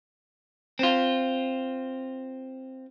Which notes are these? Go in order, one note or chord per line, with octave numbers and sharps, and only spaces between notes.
C4 F4